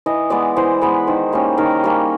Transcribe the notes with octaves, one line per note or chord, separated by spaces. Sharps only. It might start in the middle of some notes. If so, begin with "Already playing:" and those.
E3 D#5
G#3 B3 D5
E3 C5
G#3 B3 B4
D#3 C5
G3 A#3 C#4
D#3 A#4
G3 A#3 C#4